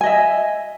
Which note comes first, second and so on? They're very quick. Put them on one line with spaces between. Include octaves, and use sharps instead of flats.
G#5 D#5 E5